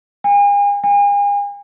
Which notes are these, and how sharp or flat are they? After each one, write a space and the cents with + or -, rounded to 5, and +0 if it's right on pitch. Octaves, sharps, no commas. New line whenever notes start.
G#5 -40
G#5 -40